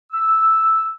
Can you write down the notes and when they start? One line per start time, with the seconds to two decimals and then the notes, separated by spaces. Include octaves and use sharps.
0.12 E6